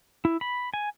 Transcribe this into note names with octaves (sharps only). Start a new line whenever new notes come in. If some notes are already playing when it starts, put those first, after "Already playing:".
E4
B5
G#5